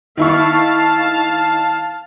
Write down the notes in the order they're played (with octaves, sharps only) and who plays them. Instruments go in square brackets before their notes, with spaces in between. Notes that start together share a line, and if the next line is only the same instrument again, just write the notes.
[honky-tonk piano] D#3 E4 C#6 [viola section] F5 A5